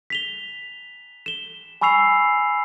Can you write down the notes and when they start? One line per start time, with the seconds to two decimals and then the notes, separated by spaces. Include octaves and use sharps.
0.10 B6 F7 G7
1.26 E7 G7
1.81 G#5 B5 C#6 E6 C7 F7